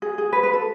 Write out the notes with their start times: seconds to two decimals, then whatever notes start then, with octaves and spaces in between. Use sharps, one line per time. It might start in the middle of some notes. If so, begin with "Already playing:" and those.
0.02 G#4
0.18 G#4
0.33 B4
0.43 B4
0.53 A4